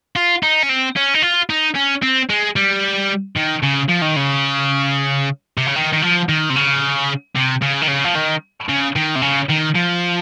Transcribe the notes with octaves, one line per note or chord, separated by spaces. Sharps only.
F4
D#4
C#4
C4
C#4
D#4
F4
D#4
C#4
C4
G#3
G3
D#3
C#3
F3
D#3
C#3
C3
C#3
D#3
D#3
F3
D#3
C3
C#3
C3
C#3
D#3
C#3
F3
D#3
C#3
D#3
C3
C#3
D#3
F3